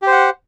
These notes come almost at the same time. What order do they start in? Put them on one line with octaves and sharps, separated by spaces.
G4 C5 F#5